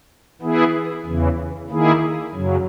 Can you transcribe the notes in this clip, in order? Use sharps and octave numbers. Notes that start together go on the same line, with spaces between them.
E3 B3 E4 G#4
E2 C#3 E3
D#3 A#3 E4 G#4
F#2 C#3 F#3